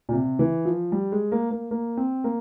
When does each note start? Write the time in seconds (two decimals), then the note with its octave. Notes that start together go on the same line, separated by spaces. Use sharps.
0.09 A#2
0.13 C3
0.39 E3
0.65 F3
0.92 G3
1.12 G#3
1.32 A#3
1.51 A#3
1.71 A#3
1.97 C4
2.24 A#3